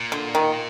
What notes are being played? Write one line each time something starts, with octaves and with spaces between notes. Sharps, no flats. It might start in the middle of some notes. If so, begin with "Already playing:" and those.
Already playing: A#2
D3
D#3